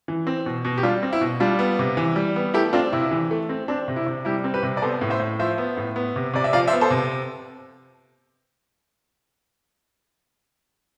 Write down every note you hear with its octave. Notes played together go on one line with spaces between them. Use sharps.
E3
C4
B2
B2
G4
G3 D4 F4
C4
E4
B2
G3 D4 F4
B3
C3
E3
G3
B3
A3 E4 G4
C4 D4 F4
C3 E4
E3
A3
C4
C4 D4
C3
E4
C3
G3 E4 G4
C4
G4 B4
C3
D5
B3 A4 C5
A2
C5 E5
A2
F3 C5 E5
B3
A2
B3
C3
C3 D5
E5
F3 D5 F5
C5 E5
B3
A4 C5
C3